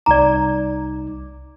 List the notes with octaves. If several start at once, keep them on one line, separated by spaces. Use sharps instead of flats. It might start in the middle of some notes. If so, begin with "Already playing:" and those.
C2 D#4 D5 A#5 D6